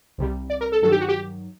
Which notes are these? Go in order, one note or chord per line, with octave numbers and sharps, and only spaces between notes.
C2 C3 G3
D5
A#4
A4
G2 D#3 F#3 A4
G4
F#4
G4